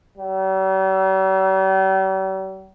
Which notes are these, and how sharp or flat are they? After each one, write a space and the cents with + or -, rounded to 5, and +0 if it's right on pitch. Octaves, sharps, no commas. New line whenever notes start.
G3 -45